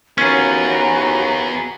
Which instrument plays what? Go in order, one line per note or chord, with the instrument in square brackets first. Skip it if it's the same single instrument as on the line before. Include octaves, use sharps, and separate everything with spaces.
[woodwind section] D#2 [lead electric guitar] B3 G#4 [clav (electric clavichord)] C#4 [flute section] F#4 G#5 A#5